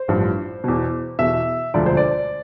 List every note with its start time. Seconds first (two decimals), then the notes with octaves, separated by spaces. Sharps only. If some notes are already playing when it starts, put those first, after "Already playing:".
Already playing: C5
0.08 A1 G2 F3
0.64 E2 B2
1.18 E2 B2 E5
1.74 E1 D2 D3 F3 D5
1.86 C5
1.97 D5